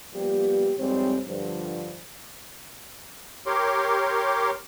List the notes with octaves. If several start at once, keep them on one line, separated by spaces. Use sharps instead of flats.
F3 G3 A#3 B3 G4
F2 G#2 G3 G#3 C4 C#5
G2 D3 F3
G4 A#4 C#5 C6 D6